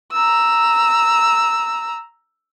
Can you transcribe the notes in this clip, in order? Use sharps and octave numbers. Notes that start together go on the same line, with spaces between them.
A#5 E6